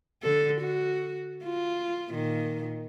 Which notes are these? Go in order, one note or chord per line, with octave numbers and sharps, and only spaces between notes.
D3 A4
F#4
F4
A#2 D#3